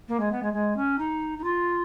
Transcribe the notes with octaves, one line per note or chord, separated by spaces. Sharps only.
A#3
G#3
B3
G#3
G#3
C#4
D#4
D#4
F4